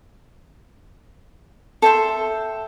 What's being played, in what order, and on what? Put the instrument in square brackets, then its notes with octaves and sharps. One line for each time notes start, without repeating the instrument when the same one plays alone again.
[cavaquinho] A4 E5 G5 C6